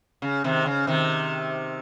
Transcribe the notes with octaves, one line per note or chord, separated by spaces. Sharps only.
C#3
C3 D#3
C#3
C3 D#3